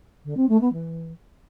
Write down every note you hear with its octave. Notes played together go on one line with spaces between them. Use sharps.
D3
C4
A3
B3
E3